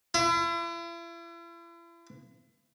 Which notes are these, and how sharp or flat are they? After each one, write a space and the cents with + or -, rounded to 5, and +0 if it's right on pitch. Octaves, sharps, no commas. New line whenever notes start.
E4 +40